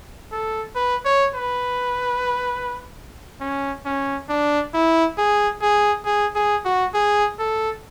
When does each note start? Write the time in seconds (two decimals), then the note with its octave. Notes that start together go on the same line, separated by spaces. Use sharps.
0.32 A4
0.75 B4
1.05 C#5
1.35 B4
3.41 C#4
3.85 C#4
4.29 D4
4.74 E4
5.18 G#4
5.62 G#4
6.06 G#4
6.36 G#4
6.65 F#4
6.94 G#4
7.39 A4